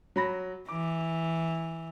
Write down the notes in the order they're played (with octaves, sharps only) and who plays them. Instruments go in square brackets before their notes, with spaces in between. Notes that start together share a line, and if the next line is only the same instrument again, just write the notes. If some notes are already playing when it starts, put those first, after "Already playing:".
[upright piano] F#3 B5 A#6
[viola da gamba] E3 [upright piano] D6